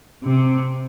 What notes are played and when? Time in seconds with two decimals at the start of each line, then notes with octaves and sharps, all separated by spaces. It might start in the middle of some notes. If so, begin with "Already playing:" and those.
0.25 C3